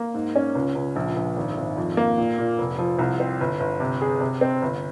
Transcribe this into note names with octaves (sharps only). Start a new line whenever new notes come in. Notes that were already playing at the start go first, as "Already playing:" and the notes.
Already playing: A#3
G#2
C#4
C#2
C#2
A#1
A#1
G#1
G#1
F2
A#3
A#2
A#2
F1
F3
C2
C4
G1
G1
C3
G#4
C3
C4
G1